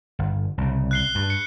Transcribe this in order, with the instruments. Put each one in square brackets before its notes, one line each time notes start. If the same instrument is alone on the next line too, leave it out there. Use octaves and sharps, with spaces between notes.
[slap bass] G1
C2 C#3
[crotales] F#6 C7 G7
[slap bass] G2
[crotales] C#7